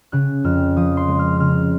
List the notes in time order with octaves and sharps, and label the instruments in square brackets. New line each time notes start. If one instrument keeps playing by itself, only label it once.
[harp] C#3 F#6
F2 F6
F3 D#6
C6
G#3
F6
C#3 F6